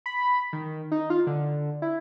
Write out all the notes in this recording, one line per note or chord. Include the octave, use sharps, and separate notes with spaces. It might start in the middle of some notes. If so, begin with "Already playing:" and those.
B5
D#3
D#4
F4
D3
E4